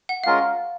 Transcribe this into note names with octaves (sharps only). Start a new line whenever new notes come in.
F#5
G#3 C#4 F4 A#4 F5